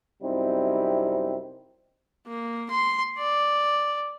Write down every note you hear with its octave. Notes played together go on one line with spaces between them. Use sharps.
F#2 C3 G3 C4 D#4 E4
A#3
C6
D5